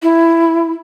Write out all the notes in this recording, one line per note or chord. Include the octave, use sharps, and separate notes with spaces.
E4